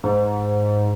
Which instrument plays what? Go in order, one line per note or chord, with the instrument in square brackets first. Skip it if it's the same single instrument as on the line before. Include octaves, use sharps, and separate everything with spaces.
[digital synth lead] G#2